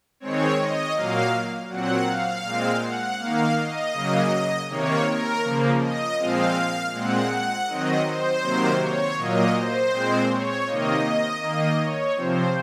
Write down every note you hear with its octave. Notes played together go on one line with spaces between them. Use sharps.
D#3 G#3 C4 C#5
D#5
A#2 F#3 A#3 F5
A#2 F#3 C4 F#5
F5
A#2 G#3 C4
F#5
D#3 A#3 F5
D#5
C#3 F#3 A#3
C3 D#3 A#3 C#5
A#4
C#3 F3 A#3
D#5
A#2 F3 G#3 C4 F5
A#2 G#3 C4 F#5
F#5
D#3 F#3 C4 D#5
C5
C3 D#3 F#3 A#3
C#5
A#2 F#3 A#3 D#5
C5
A#2 G#3 C4
C#5
C3 D#3 A#3 D#5
D#5
D#3 A#3 D#5
C#5
C3 F3 C4 C5